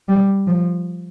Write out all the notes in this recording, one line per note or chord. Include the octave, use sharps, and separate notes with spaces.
G3
F3